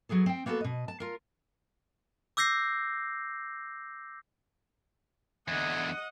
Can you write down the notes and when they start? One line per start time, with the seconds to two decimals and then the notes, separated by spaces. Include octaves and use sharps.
0.09 F#3 B3 G#4 A4
0.26 C4 G5
0.46 A#3 B3 F#4 G4 A4
0.61 B2 D#5
0.88 A5
1.00 F4 A#4
2.37 D6 E6 G6 A#6 C7
5.48 E2 D3 D#5 F#5 G#5